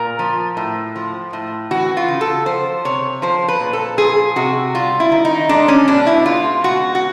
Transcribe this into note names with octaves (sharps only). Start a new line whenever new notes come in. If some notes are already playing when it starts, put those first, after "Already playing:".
Already playing: A#2 A#4
F3
A2
F3
A2
E3 F#4
F4
C#3
A4
F3 C5
C3 C#5
F3 C5
B4
A#2
A4
F3 G#4
C3 F#4
G3 F4
E4
D#3
D#4
G#3 D4
C#4
B2 D4
E4
G#3 F4
B2 F#4
F#4